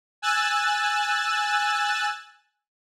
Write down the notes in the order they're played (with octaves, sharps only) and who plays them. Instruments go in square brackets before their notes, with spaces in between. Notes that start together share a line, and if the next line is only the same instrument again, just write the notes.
[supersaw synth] G#5 E6 F#6 A6